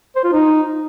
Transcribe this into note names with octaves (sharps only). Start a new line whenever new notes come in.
C5
F4
D#4